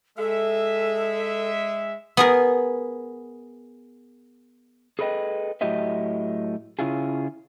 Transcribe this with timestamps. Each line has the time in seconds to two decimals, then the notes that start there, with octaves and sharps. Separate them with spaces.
0.18 G#3 A4 E5
2.17 B3 G#4 A#4
4.99 G#4 A4 B4 C5 D#5 G5
5.61 A2 F#3 G4 D#5 E5
6.79 C#3 C#4 E4 F4 G#4